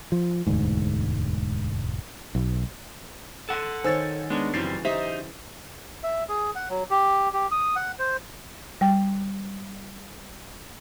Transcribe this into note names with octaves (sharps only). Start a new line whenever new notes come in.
F3
E1 D2 G#2
B1
A4 F#5
D#3 C5 C#5 G#5 E6 A6
G#3 B3 D4 A#5 C#6
F#2 C#3 E3 F#3 G3 C4 A6 C7
D#4 G4 C5 E5
E5
G#4
F#5
F#3
G4
G4
D#6
F#5
C5
G3 G5